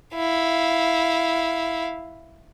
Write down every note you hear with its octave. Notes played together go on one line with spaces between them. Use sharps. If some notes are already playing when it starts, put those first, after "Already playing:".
E4 F5